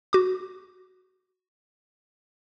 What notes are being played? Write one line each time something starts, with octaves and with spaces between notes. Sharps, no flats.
F#4 D6